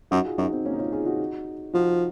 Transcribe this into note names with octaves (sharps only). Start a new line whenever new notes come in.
F#2 D#4 F#4
F4 G#4
F#2 D#4 F#4
C4 D#4
A#3 C#4
D#4
C#4 F4
F4 G#4
D#4 F#4
F3 D#4 F#4